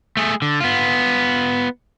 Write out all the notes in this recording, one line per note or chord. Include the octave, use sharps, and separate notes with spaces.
A3 G#4
D3
B3 F4